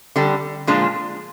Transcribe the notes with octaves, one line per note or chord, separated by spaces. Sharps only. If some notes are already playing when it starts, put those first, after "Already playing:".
D3 G3 D4
A#2 F3 G#3 D4 F4